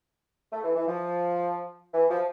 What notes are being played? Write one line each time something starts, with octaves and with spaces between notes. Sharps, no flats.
A3
E3
E3
F3
E3
F3